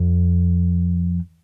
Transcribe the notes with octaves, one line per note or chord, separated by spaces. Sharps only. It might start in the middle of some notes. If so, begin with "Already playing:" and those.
Already playing: F2